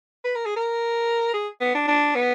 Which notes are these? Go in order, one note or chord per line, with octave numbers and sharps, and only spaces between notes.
B4
A#4
G#4
A#4
G#4
B3
D4
D4
B3